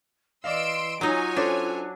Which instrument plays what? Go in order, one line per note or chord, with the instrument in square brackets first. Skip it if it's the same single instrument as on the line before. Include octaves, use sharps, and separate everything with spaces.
[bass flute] E3 [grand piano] D5 D#5 F5 [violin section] C6 E6 D7
[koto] F#3 D#4 [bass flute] F4 [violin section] C#5 G#5
[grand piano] C#4 A4 C5 [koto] D4